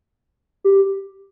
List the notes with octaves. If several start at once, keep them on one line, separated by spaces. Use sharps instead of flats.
G4